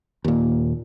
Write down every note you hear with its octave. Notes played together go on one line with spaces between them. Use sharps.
D#2 A#2